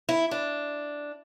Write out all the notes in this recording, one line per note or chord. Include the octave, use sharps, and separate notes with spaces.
E4
D4